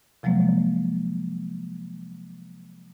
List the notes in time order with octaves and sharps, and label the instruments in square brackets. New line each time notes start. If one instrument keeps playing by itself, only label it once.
[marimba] C3 F3 F#3 G#3 A#3